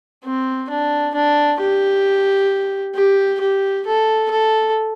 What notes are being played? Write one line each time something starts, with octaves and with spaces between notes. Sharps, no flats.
C4
D4
D4
G4
G4
G4
A4
A4